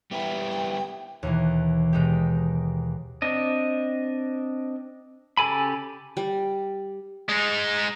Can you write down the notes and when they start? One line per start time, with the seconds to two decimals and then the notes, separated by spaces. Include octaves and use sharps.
0.11 G3 B3 E4 G5
1.23 D#2 B2 E3
1.93 B2 G#3 D#4 G4
3.22 C4 D4 D#5
5.37 C#3 G4 A4 G#5 B5
6.17 G3
7.29 G#3 D#4